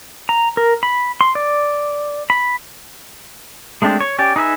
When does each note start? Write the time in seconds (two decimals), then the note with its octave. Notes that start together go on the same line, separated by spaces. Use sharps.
0.29 A#5
0.57 A#4
0.83 B5
1.21 C6
1.35 D5
2.30 B5
3.82 G#3 A3 C4 D4 G4
4.00 C#5
4.19 C#4 G4 D5
4.36 D#4 G#4 B4 E5 G#5